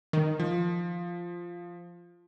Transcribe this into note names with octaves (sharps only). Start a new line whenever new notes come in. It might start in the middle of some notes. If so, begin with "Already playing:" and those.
D#3
F3